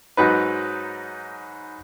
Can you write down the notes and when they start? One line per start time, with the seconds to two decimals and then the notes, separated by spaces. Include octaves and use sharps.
0.17 G#2 F#3 D#4 B4